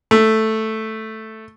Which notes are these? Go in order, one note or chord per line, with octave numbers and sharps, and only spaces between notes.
A3